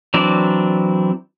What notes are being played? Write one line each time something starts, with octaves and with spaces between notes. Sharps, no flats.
E3 F#3 C4 D4 D5